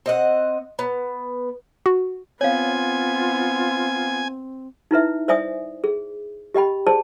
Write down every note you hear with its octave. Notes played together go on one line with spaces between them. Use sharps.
C4 D#5 F#5
B3
F#4
B3 C4 F4 C#5 F5 G#5
D#4 E4 B4 E5
C5 D5 E5 G#5 D#6
G#4
G4 D#5 G5 B5
G#4 C5 D5 A5